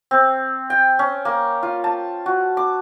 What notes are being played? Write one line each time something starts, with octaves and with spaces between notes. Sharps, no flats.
C4
G5
C#4
A#3
F4
A5
F#4
D6